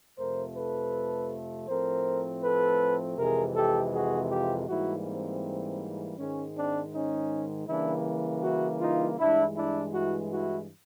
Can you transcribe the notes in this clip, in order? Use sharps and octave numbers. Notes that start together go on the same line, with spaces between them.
F2 C3 F3 A3 A#4 C5
A4 B4
A2 F3 A3 C4 A#4 C5
A4 B4
F2 C3 E3 G#3 G#4 A#4
G4 A4
F#4 G#4
F4 G4
G#2 E3 G3 A#3 E4 F#4
C4
G#2 D#3 G#3 C#4
C4 D4
C#4 D#4
C#3 E3 G3 A#3 D4 E4
E4 F#4
D#4 F4
G2 E3 G#3 D4 E4
D4 E4
E4 F#4
E4 F#4